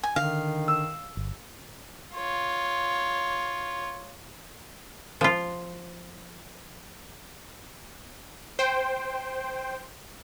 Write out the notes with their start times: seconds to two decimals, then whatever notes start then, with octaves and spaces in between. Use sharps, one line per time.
0.03 G#5
0.16 D3 D#3 F5
0.68 E6
1.17 G1
2.16 F4 C#5
5.21 F3 F4
8.59 C5 G5